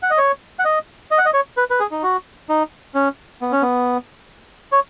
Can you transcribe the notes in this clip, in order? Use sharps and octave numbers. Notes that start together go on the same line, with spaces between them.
F#5
D#5
C#5
F#5
D#5
D#5
F#5
D#5
C#5
B4
B4
G#4
D#4
F#4
D#4
C#4
B3
C#4
B3
C#5